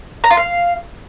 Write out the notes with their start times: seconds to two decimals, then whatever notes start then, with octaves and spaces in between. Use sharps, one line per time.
0.24 A#5
0.30 F4
0.37 F5